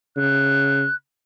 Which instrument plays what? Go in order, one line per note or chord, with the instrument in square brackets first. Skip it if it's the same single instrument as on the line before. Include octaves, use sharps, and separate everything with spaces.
[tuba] C#3 [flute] F#6